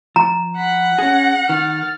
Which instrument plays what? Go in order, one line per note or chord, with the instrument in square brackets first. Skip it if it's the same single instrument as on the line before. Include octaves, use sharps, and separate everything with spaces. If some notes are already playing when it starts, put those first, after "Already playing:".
[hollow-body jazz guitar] F3 [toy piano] A#5
[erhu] F#5 [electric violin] B5
[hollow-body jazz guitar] C#4 G#4 [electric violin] A#6
[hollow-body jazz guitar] D#3 [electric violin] F6 A6